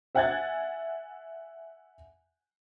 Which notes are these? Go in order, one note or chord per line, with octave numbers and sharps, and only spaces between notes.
E5 F#5 G#5 F#6 G#6 A6